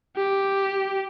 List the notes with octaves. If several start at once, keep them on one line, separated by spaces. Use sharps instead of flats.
G4